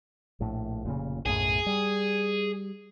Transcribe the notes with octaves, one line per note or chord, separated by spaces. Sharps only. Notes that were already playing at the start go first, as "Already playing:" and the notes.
A#1 A2
F1 A#2 C#3
B1 F#2 A2 G#4
G3